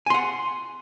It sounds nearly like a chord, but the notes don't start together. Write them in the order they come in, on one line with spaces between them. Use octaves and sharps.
G#5 C6 F#5